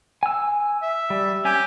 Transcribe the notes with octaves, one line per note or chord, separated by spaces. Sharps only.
G#5 E6
E5
G3
C#4 G4 G#5